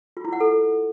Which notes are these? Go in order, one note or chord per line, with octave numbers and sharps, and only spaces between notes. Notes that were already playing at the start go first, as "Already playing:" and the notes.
F4
E4
F#5
A4